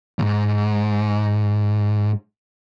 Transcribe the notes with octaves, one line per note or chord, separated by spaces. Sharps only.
D#2 G#2